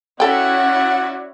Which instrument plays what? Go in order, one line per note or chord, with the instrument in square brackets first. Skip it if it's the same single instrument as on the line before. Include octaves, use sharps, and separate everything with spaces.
[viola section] C#4 E4 F#4 [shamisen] A4 G5 [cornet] D5 [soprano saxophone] F#5